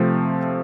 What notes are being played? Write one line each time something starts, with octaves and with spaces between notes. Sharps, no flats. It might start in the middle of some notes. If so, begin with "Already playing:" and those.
Already playing: C3 F3 A3 C4